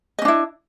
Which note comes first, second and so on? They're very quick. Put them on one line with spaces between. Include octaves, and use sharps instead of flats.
D#5 C#4 D4 E4